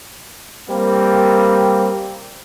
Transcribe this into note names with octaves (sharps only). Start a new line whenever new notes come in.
G3 A#3 C4